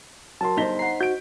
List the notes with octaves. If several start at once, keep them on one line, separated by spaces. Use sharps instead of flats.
F#3 A#4 A5 C6
G1 D#4 C5 B6 G7
F#5 A#5 C7
F#4 G6 D7